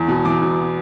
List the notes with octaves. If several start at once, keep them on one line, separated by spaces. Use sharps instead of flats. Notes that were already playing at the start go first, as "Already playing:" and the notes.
Already playing: E2
B2
E2 D6
B2